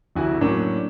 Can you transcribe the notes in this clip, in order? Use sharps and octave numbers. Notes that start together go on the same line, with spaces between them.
F1 D2 D3 E4 F#4 G#5
A2 F#3 A#3 C#4 D4